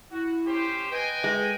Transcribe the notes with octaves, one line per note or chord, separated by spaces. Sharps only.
E4 F#4
C#4 G4 C5
B4 D#5 G5 G#5
G#3